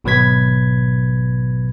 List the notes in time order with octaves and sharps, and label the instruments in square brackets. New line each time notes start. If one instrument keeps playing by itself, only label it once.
[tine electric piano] G#1 B2 F#3 B4 G#6 B6